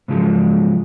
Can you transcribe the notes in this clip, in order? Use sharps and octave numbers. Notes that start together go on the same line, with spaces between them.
G#2 C#3 F3 F#3 G#3